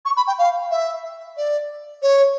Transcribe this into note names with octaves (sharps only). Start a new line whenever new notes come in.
C#6
B5
G5
F5
E5
D5
C#5